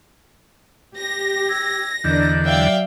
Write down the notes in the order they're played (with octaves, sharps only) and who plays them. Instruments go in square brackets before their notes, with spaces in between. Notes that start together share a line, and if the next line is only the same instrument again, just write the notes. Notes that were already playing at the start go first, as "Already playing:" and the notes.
[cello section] G4 [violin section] A#6
[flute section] E6 G#6
[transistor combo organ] E2 D3 [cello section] D4 A#4 D5 [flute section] D#5 G6
[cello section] F#3 F5 [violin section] D5 E5 G5